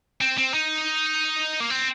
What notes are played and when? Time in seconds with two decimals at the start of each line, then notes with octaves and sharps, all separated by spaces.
0.21 C4
0.38 C4
0.54 D#4
1.60 A#3
1.70 C4